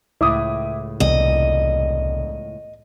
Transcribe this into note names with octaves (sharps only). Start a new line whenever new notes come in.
C#2 A2 E4 D6 D#6
E1 C2 D#5